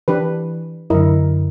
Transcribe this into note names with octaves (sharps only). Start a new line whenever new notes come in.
E3 D4 G4 B4
F#2 D3 E4 A#4 D#5